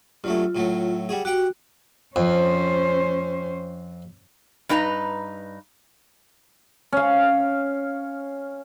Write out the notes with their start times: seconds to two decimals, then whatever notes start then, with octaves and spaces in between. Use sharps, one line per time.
0.24 G2 F#3 A3 F4
0.55 A2 F#3 A3
1.09 G3 F#4 G#4
1.25 F#4 G4 F#5 G5
2.16 F2 C#4 C5
4.69 G2 D#4 B4 G#5 A#5
6.93 C#4 F5